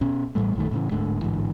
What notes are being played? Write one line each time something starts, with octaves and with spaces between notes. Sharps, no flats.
B2 C#4
A1 A2 G3 A3
A#1 F2 D#3 A3
A2 C#3 E3
D1 G#2 D3 A3
A1 G#2 D3 E3